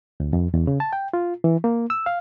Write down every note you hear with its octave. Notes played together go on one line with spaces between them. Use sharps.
D2
F2
E2
C#3
A5
G5
F4
E3
A#3
E6
F5